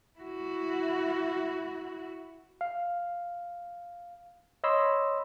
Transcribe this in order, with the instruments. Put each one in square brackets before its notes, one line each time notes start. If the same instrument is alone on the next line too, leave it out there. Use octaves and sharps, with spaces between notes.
[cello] E4 F#4
[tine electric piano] F5
C#5 D#5 B5 C6 E6